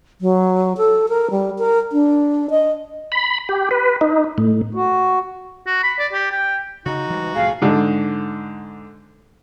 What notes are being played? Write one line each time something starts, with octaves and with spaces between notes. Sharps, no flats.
F#3
A4
A#4
G3
A#4
D4
D#5
B5
G4
B4
D#4
A2
F#4
F#4
B5
D5
G4
G5
C#3 D#4 F#4
E3 G3 G#3
C2 A2 F3 G#4 F5
G#2 D3